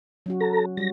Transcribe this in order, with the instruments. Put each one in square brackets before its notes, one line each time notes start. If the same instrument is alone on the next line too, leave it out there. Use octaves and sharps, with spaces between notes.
[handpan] F#3 C#4 F#4
[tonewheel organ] A4 A#5
[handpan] G3 F#4 [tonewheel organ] A#6